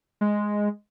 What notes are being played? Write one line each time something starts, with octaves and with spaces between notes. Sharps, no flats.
G#3